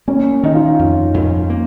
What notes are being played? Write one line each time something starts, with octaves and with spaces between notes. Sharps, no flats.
A#3 C#4
D#3 D#4
F4
F2
F2
A#3